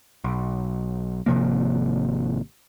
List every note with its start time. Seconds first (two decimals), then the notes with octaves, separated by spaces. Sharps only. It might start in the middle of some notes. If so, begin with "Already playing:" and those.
0.24 B1
1.26 G#1 C3 F3 A#3